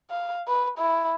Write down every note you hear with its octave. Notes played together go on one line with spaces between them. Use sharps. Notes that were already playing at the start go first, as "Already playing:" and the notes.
F5
B4
E4